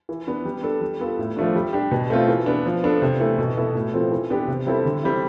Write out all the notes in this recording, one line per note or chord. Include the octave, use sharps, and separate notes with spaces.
E3
B3 D4
G3
D4 A4
G3
B3 F4 A4
A2
F3 A3 D4
G3
D4 G4
B2
A3 C4 F4
E3
B3 D4
F3
B3 D4 A4
C3
E3 A3
B2
B3 E4 A4
A2
F3 C4 F4 A4
E3
B3 D4 G4
C3
G3 C4 E4 A4
D3
G3 C4 E4